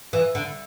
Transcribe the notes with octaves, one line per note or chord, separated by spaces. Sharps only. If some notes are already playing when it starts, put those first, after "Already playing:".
E3
D3